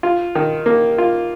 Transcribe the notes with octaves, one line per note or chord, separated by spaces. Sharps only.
F4
D#3
A#3
F4